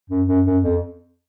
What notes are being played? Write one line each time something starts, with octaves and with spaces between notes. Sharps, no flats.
F#2
F#2
F#2
F2